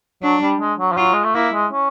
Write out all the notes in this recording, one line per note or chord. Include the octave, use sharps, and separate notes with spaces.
F#3 D4
G3
G#3
F#3
F3
F#3 F4
G#3
A3
A#3 E4
G#3
C#4